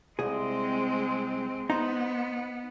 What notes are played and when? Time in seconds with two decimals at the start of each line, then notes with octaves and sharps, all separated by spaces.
0.19 C2 G#3 C4 G#4
1.70 B3 D#4 C5